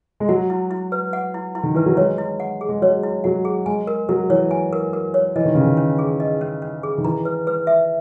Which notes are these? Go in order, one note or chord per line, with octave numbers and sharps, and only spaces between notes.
G#3
F#3 F#5
E4
E4
B4
F#5
E4
E4
D#3
E3 B4
F#3
G#3 C#5
E4
F#5
G#4
G#3
F#3 C#5
E4
F#3 F#5
G#4
G#3 G#5
A#4
F#3 A#4
E3 C#5
G#5
A#4
A#4
C#5
E3 D#5
D#3
C#3 C#4
D#3
C#4
G#4
D#5
C#4
C#4
G#4
D#3
E3 A#5
B4
B4
E5